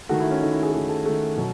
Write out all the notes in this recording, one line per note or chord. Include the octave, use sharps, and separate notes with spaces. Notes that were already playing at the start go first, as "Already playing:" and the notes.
D#3 A3 F#4
E4
C#4
D#3 A3 D#4
E4
G#4
D#3 A3 G#4
A4
D#3 A3
B2 F#3